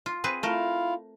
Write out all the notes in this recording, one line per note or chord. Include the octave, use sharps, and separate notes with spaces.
F4
C4 G#4 B4
A3 E4 F4 A#4 F5